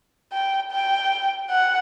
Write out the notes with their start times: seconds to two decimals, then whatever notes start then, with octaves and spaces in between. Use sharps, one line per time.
0.32 G5
0.71 G5
1.50 F#5